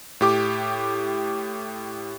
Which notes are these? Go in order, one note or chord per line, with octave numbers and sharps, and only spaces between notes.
A2 G4 D6